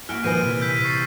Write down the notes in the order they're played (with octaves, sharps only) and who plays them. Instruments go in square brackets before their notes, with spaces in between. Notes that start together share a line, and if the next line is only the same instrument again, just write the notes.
[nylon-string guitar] A#3 F#5 G#5 [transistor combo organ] E4 F#4 [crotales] F6 F#6 D7
[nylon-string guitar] A#2 B4 G#5 [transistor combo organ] D#3 F3 C5 [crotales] D#7
[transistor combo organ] C3 E3
[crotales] E6 G6 B6
C#6 A6 C7